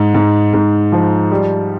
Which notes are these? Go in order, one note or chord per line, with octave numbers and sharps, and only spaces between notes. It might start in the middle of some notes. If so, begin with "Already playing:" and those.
Already playing: G#2
G#2
G#2
F3
G3